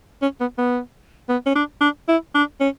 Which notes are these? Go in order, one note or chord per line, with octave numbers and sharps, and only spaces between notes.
C#4
B3
B3
B3
C#4
D4
D4
E4
D4
C#4